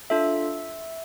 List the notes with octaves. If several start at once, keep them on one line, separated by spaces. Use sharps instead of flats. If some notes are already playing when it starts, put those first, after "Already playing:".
D4 F4 A4 E5